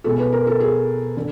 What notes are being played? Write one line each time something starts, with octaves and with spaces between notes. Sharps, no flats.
B2 G#3 A4
B4
A#4
A4
G#4
D3